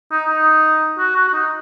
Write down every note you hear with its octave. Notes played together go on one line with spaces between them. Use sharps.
D#4
D#4
F#4
F#4
F#4
D#4